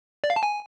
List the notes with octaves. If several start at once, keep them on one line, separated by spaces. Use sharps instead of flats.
D5
F5
A5
G#5